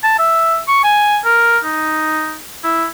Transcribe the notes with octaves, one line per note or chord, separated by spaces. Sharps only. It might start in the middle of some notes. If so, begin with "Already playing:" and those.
A5
E5
C#6
G#5
A#4
D#4
E4